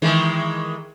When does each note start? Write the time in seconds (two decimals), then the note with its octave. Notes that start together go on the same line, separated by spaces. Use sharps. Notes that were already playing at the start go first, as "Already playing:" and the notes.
0.02 D#3 E3 G#3